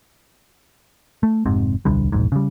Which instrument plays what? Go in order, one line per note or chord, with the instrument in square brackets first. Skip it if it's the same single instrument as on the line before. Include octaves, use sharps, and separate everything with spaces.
[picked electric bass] A3
F1 G#2 C3 C4
D#1 C2 D3 G3
E1 A#1 G#2
C#3 G3